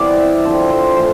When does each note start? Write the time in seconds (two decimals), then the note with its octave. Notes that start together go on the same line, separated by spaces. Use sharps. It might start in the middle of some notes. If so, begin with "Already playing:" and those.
Already playing: C3 E3 G3 B3 D5
0.17 E5
0.43 D3 F3 C4 E5
0.70 C5
0.96 A2 E3 C5